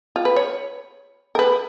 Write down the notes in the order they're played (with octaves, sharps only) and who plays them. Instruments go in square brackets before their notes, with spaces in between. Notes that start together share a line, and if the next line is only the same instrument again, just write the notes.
[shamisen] F4
B4
C#5
A#4
B4